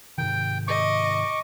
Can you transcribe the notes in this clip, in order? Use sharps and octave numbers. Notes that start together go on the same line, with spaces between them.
G#2 C3 D#3 G5
D#5 C#6 D6